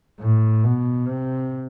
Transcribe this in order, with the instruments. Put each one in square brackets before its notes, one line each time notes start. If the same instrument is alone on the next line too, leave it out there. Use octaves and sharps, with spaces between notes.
[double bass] A2
B2
C3